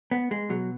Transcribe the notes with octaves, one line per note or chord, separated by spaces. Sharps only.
B3
G#3
B2 F#3